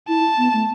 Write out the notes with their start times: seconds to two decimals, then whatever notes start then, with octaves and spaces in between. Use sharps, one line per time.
0.08 E4 A5
0.38 B3
0.53 A3